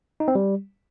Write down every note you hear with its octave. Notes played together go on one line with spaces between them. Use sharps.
D#4
C4
G3